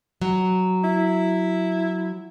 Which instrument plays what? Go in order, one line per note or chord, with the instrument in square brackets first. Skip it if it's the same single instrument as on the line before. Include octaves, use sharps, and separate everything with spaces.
[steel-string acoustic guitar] F#3
[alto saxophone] E4